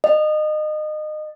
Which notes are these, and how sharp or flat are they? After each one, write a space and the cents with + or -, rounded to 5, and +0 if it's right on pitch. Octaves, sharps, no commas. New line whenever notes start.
D#5 -25